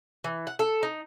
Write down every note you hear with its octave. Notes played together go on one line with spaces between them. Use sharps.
E3
F#5
A4
D#4